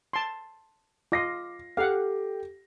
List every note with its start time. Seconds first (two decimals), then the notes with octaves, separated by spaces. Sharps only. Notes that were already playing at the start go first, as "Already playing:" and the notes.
0.13 A5 C6
1.12 F4 D#5 D6 A#6 C7
1.77 G4 A4 F5 F#5